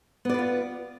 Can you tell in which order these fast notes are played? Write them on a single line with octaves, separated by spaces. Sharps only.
B3 D5 B4 F4